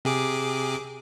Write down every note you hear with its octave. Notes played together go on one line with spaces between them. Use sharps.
C3 G#4 D6